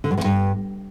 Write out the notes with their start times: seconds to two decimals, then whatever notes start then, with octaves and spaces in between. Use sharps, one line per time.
0.04 D3
0.11 F#2
0.18 E2
0.24 G2